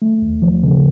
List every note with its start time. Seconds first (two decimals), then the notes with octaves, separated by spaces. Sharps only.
0.02 A3
0.22 D#2
0.42 F3
0.63 C#3